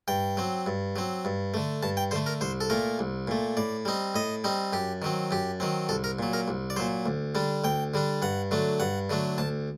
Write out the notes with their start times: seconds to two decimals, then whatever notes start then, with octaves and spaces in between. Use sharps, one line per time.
0.08 G2 G5
0.37 F#3 C4
0.66 G2
0.96 F#3 C4
1.25 G2
1.54 D3 A3
1.83 G2 A5
1.97 G5
2.11 D3 A3 C5
2.26 A#4
2.41 C2 C5
2.61 A4
2.70 A#2 A3 A#4
2.99 C2
3.28 A#2 A3
3.57 A2 D5
3.85 G3 C4 D#4
4.15 A2 D#5
4.44 G3 C4 D#4
4.73 F#2 G4
5.02 D#3 F#3 C4
5.31 F#2 G4
5.60 D#3 F#3 C4
5.89 C2 A4
6.04 A#4
6.19 A#2 F#3
6.33 A#4
6.48 C2
6.70 D5
6.76 A#2 F#3 C5
7.06 D2
7.35 D3 G3 D4
7.64 D2 G5
7.94 D3 G3 D4
8.22 G2 F#5
8.51 D3 F#3 A3 D4
8.80 G2 F#5
9.10 D3 F#3 A3 D4
9.38 D2 A5